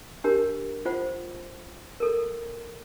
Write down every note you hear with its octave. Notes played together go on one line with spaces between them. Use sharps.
D4 G4 A#4
F4 C5 F#5
A4 A#4